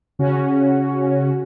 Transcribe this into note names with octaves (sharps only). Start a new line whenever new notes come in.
C#3 C#4 F#4